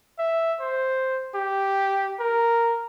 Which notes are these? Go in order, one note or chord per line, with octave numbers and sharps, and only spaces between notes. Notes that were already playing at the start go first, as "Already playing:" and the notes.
E5
C5
G4
A#4